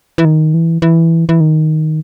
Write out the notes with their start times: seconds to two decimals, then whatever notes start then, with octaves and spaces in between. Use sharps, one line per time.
0.18 E3
0.25 D#3
0.54 E3
0.82 E3
1.29 E3
1.40 D#3